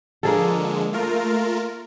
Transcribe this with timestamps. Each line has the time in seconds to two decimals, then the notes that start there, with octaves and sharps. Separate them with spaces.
0.23 D3 F3 G#3 A#3 G#4 A4
0.93 A3 F4 A#4